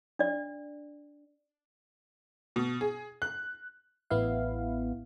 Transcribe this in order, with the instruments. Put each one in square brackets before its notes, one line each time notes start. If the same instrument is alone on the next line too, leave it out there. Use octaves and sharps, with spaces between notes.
[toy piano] D4 D5
[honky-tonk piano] B2
G#4
F#6
[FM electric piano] A1 B3 E4 F5